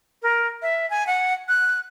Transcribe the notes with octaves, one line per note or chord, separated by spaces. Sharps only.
A#4
E5
G#5
F#5
F#6